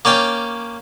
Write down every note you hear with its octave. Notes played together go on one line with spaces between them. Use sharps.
A#3 C#4 D5 G5